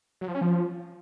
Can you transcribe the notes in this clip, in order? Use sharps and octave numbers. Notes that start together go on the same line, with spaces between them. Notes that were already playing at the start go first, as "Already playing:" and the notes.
F#3
F3
C#4
F3